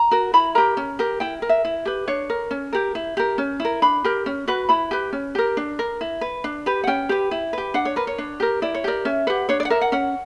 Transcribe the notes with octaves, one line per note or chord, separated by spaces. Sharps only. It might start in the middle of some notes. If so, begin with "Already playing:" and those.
Already playing: A#5
F#4 A#4
E4 B5
G4 A#4 A#5
C#4
G4 A#4
E4 G5
A#4
E5
E4
G4 B4
D4 C#5
A#4
C#4
G4 A#4
E4
G4 A#4
C#4
E4 A#4
D4 B5
G4 A#4
C#4
F#4 B4
E4 B5
G4 B4
C#4
G4 A#4
D4
A#4
E4
B4
D4
G4 B4
F#5
C#4 G5
G4 B4
E4
G4 B4
D4 F#5
C#5
A#4 B4
C#5
D4
G4 A#4
E4 D5
C#5
G4 A#4 D5
C#4 E5
G4 B4 F#5
D4 C#5
D5
F#5
A#4 E5
F#5
C#4 F#5